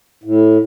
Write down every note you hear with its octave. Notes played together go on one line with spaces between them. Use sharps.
A2